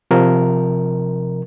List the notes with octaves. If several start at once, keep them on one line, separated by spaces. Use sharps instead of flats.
C3 F3 A#4